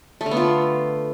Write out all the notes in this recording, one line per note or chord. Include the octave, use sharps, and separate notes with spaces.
A3
D3
B3
F4